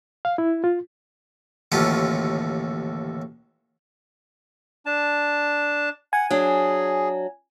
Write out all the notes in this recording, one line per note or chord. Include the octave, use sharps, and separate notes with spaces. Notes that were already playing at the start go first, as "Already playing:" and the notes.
F5
E4
F4
A1 D#2 D3 F#3 C#4 F4
D4 A5
F#5 G#5
F#3 D4 G#4